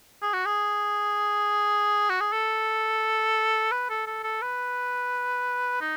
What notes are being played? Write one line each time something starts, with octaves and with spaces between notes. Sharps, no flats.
G#4
F#4
G#4
F#4
G#4
A4
B4
A4
A4
A4
B4
D#4